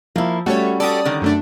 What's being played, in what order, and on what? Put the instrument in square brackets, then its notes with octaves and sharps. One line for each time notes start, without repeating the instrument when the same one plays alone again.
[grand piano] F3 [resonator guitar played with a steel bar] A#3 E4
[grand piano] G3 C#4 [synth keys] A3 A4 C#5 [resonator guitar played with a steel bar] F#4
[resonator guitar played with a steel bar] F#4 G4 A4 [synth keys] D5 D#6
[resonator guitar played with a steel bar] D3 D#3
[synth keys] F#2 A3 D4